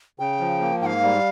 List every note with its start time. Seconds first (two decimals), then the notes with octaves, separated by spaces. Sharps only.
0.19 C#3 G5
0.40 F3
0.61 A#3
0.81 G#2 F5 G5
1.03 G3